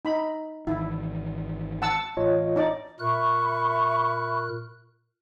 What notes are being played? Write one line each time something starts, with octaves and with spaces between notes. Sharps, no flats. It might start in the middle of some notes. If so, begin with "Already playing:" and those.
D#4 B5
G#1 D#3 E3 E4
F#5 A5 E6
A1 F4 C#5 D#5
D#4 D5
A#2 A#4 E5 B5 C#6 F#6